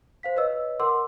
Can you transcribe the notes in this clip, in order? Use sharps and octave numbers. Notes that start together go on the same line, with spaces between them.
C5 F5 B6
B4 C#5 D#5 E6
A#4 F#5 C6 D6 E6